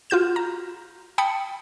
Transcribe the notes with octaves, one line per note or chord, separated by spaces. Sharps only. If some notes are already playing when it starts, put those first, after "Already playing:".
F4 F#4 G6 E7
A#5
G5 A5 B5 D#6 C#7